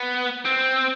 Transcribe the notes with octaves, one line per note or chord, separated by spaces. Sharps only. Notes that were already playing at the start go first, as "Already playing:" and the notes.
Already playing: B3
C4